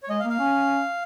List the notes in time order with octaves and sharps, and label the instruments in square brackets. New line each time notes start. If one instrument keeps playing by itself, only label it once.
[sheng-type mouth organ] C#5
[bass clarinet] G#3 [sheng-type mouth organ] D#5
[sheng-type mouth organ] F5
[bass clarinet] A#3
[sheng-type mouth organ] F5
[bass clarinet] C#4